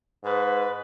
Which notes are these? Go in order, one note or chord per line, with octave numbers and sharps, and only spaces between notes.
G#2 B4